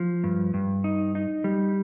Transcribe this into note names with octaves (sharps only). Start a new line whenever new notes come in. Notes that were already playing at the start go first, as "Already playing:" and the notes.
Already playing: F3
G2
G2
D#4
D#4
G3